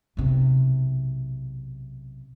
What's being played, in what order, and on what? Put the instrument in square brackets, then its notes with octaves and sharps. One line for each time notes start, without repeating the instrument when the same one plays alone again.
[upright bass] B1 C3